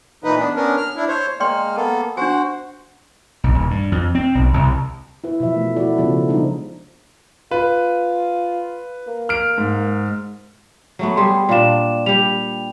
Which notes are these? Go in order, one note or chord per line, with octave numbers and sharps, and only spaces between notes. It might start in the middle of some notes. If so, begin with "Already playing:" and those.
A#2 E3 D#4 B4
B3 D4
B3 C#4 D4 A#4
F6
D4 E4
C5 C#5
G#3 A#3 D5 G5 C6 F6
A#3 B3 A4 A5
D4 F#4 C5 F#5 G#5
B1
D#1
G2
F2
C4
B1
C2
E4 B4
B2 E3 F3 E5
A3 A#4
E4 F#4 A4 D5
C#3 F3 B3 D5
G3 G#3 B3 D4 D#4 F4
F4 B4
A#3
F6 D7
G#2
F#3 A3 B3
G3 G#4 C6
A#2 D4 D5 F5 E7
G3 G4 F7